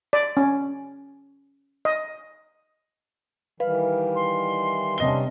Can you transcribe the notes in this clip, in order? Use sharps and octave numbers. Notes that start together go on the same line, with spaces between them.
D5
C#4
D#5
D#3 E3 G3 B4 F5
C6
C3 G3 C#4 D4 D#5 G7